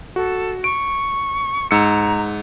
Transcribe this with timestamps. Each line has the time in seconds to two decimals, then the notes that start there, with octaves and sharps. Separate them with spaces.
0.16 F#4 A4
0.64 C#6 D7
1.71 G#2 A#5 E6 C#7